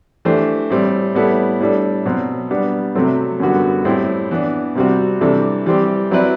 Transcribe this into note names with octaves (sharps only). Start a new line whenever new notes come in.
E3 A3 D4 G4 C5
A2 G3 C4
A2 G3 B3 E4 A4
A2 G3 D4 A4
B2 F#3 C4
G3 B3 D4
C3 F#3 A3 C4
F#2 D3 G3 B3 F#4
A2 G3 C4 E4 G4
E3 B3 D4
C3 G3 C4 F#4
C3 E3 G3 D4 A4
E3 G3 C4 G4
F#3 C4 E4 B4 D5